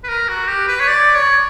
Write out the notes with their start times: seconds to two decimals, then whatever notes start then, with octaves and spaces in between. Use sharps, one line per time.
0.04 B4
0.09 A#4
0.29 F#4
0.48 G4
0.68 B4
0.80 C#5
0.87 D5
1.15 C#5